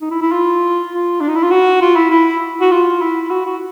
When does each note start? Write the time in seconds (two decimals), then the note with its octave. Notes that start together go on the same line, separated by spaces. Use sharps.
0.01 D#4
0.11 E4
0.22 E4
0.32 F4
0.92 F4
1.21 D4
1.29 D#4
1.36 E4
1.43 F4
1.51 F#4
1.81 F4
1.96 E4
2.10 E4
2.61 F#4
2.71 F4
3.01 E4
3.30 F#4
3.46 F#4